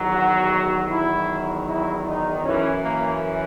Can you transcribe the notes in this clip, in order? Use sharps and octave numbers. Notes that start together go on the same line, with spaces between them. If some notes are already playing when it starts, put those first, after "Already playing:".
Already playing: E2 D#3 F#3
F#4
E2 D#3 F#3 E4
E4
D#4
F#2 E3 C#4
A#3